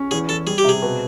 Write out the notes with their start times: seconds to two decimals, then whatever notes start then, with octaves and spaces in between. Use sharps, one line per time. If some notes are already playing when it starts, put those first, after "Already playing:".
Already playing: C#4
0.11 E2 G#4
0.29 E2 A4
0.47 G3 G#4
0.58 G4
0.64 C3 G#4
0.82 B2